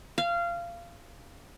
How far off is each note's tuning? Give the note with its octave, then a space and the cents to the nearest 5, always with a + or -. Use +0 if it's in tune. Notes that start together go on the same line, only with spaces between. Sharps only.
F5 -20